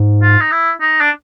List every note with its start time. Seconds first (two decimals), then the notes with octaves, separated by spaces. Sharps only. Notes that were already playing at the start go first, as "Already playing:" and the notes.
Already playing: G#2
0.22 F4
0.40 D#4
0.51 E4
0.81 D#4
1.01 D4